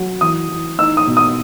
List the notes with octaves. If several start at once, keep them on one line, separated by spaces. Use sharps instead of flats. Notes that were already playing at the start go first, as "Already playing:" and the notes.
Already playing: F#3
E3 D#6
E3
D#4 E6
D#6
B2
D#6